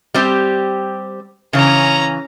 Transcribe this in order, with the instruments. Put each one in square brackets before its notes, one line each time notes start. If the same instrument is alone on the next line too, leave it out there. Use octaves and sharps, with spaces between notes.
[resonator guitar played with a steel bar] G3 C4 G4
[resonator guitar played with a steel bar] C#3 E3 [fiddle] C#4 A#5